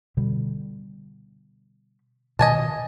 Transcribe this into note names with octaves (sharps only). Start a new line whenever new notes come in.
B2 D3 G3
B2 D#3 D#5 G#5 A5